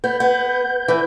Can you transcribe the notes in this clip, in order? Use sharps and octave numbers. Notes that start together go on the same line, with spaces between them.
B3 B4 G6
B3
E3